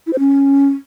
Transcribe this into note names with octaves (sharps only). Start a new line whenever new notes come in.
E4
C5
C#4